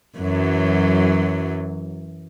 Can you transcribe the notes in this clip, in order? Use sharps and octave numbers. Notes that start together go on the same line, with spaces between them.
F#2 E3 F#3